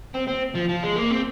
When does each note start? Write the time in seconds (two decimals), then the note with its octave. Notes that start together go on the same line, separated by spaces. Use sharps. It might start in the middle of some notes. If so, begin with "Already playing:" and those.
0.15 C4
0.28 C4
0.55 F3
0.69 F3
0.83 G#3
0.96 A#3
1.11 C4